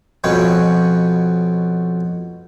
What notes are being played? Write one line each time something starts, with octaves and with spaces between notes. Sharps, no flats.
F2 B2 C#4 B4 C#5 G5